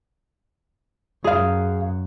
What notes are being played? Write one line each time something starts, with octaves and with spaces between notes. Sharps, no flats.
F#2 G#4 F5